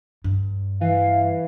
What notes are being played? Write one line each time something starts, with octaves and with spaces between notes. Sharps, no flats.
G2
E3 F5